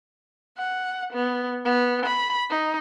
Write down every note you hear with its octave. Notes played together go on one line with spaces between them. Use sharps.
F#5
B3
B3
B5
D#4